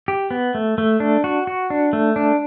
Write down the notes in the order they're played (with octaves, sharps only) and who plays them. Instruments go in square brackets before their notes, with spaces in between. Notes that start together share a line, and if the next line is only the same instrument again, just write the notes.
[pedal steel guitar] G4
B3
A3
A3
D4
F#4
F#4
D4
A3
D4